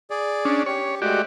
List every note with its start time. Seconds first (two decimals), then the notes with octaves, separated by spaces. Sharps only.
0.11 G#4 D5
0.45 C#4 D4
0.66 G4 C#5
1.02 G#3 A3 F#4 G4 D5